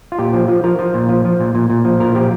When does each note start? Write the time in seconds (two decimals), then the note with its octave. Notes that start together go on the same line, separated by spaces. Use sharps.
0.12 F4
0.19 A#2 G4
0.33 F3
0.48 F3
0.64 F3 A#4
0.79 F3
0.94 A#2
1.09 F3
1.25 F3
1.40 A#2
1.55 A#2
1.70 A#2
1.85 F3
2.00 A#2 A#4
2.15 F3 G4